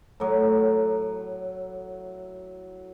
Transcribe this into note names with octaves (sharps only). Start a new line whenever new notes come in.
A2 F#3